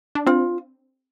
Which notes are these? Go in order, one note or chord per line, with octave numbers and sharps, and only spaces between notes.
D4
C4 F4